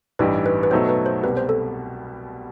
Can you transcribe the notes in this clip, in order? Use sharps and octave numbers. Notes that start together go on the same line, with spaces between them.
A1 G2 E3 G3 D#4 B4
B4
B4
B2 F#3 A3 D#4 A4 C5
B4
C5
C2 B2 G3 B4
C5
A4